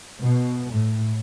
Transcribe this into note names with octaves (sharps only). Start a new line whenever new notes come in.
B2
A2